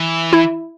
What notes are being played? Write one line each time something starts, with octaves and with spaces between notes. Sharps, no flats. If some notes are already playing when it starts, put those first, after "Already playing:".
Already playing: E3
E4